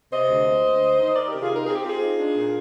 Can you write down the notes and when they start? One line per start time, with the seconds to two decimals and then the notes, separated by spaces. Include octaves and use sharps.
0.11 C3 C5 D#5
0.28 D2
0.46 A#3
0.64 D2
0.81 A#3
0.98 D#3
1.15 D#4 A#4 D5
1.28 C3 G4 A#4
1.41 F4 G#4
1.50 D#4 A#4
1.65 C4 G#4
1.75 G4
1.85 C4 F4 G#4
2.02 D#4
2.19 D4
2.37 A#2